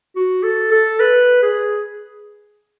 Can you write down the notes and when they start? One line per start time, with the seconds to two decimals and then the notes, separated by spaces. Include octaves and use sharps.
0.16 F#4
0.43 A4
0.71 A4
1.00 B4
1.43 G#4